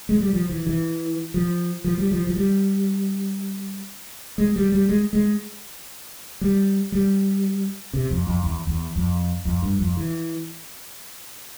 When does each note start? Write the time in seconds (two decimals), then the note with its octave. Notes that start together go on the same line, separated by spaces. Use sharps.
0.09 G#3
0.21 G3
0.33 F3
0.49 E3
0.67 E3
1.34 F3
1.84 F3
1.98 G3
2.12 F3
2.27 F3
2.36 G3
4.38 G#3
4.56 G3
4.72 G3
4.89 G#3
5.13 G#3
6.41 G3
6.92 G3
7.93 C3
8.10 F2
8.27 F2
8.44 E2
8.67 E2
8.96 F2
9.45 F2
9.62 G2
9.79 F2
9.97 E3